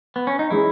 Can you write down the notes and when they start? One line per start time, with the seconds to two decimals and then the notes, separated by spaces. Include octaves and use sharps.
0.16 B3
0.27 C#4
0.39 D#4
0.50 E3 G#3 C#4 E4 G#4